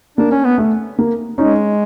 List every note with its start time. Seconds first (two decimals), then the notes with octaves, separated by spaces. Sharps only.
0.17 A#3 D4
0.31 C#4
0.44 B3
0.58 A3
0.99 A#3
1.38 G#3 C#4 D#4